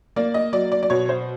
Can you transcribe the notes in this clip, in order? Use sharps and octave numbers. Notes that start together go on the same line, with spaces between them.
A#3 D5
D#5
F#3 D5
D5
D5
B2 C#5
C5